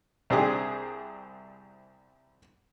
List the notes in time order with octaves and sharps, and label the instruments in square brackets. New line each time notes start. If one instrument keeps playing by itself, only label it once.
[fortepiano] C2 C4 D4 G4 G#4 D6